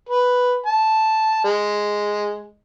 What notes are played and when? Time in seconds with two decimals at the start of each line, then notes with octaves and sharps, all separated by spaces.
0.09 B4
0.66 A5
1.45 G#3